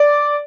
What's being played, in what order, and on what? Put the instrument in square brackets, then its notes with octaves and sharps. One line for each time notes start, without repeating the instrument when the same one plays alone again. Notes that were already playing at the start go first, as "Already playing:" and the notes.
Already playing: [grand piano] D5